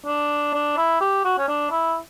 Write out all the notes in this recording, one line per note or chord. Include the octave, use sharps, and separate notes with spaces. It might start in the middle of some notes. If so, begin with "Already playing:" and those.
D4
D4
E4
G4
F#4
C#4
D4
E4